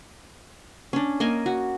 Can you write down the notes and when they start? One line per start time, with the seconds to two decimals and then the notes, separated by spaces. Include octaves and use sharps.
0.93 C#4 D4
1.20 A#3 D#5 G#5
1.46 F#4